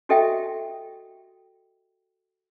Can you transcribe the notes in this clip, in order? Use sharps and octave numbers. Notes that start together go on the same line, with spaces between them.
F#4 G4 A4 D#5 E5 G5